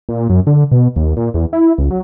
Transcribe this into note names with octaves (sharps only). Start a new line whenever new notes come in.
A#2
F#2
D3
B2
D#2
A#2
E2
E4
C#2
F#3